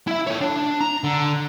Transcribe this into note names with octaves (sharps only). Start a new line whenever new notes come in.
E4 E5
A4 C#5
D4
A#5
D3